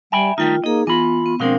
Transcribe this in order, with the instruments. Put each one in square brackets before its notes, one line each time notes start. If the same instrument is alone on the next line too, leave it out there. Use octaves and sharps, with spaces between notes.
[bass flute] G3 [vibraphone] E5 [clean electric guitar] G5 G#5 B5
[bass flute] D#3 [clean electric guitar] G3 A3 D#4 [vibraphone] F4 G5
[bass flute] A#3 [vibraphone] D#4 G#4 [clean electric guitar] D#5
[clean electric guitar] E3 B5 [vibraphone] B3 [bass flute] F4
[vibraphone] B3
[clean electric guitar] B2 F3 G#3 [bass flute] C4 [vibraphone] D4 A#4 F5